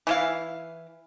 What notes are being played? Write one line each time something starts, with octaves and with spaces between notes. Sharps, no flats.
E3 E4 F5